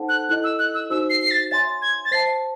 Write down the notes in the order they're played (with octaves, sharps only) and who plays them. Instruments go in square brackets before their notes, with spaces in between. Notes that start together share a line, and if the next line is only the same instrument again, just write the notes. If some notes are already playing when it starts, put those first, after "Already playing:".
Already playing: [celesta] D#4 A4 C5 F#5 A5
[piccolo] F#6
[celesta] E4 A4 D#5 [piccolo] F#6
[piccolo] E6
F#6
E6
[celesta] D#4 F#4 C5 [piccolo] E6
[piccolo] C7
C7
A6
[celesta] C#5 E5 G#5 C6 [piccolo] A6
[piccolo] G#6
A6
[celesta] C5 E5 A5 [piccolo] C7